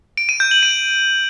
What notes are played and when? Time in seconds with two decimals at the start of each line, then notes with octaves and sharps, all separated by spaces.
0.17 D7
0.29 D#7
0.40 G6
0.51 F#7
0.63 D#7